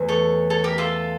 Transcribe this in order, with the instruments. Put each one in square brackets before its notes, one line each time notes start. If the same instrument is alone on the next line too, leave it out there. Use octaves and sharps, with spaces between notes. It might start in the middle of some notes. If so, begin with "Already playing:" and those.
Already playing: [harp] E2 E3 A3
[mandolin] A4 C#5
A4 C#5
G4 A#4
F4 A4